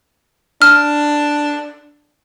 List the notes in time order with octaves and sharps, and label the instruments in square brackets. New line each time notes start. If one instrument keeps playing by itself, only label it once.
[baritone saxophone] D4 [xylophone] F6